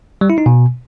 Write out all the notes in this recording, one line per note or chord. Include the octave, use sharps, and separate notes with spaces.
G3
E4
D#4
B2